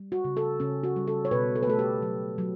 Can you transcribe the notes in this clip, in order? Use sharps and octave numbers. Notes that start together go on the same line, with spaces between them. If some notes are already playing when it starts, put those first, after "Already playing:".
Already playing: G3
F#4
C#3
A4
C#3 C#4
F#4
G3
A4
C#5
B2 B4
A4
B4
A3 A4
G4
F#3
F#3